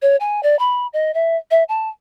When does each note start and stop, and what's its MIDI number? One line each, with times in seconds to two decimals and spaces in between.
0.02 0.16 73
0.20 0.43 80
0.43 0.58 74
0.59 0.87 83
0.93 1.13 75
1.14 1.37 76
1.51 1.64 76
1.69 1.89 81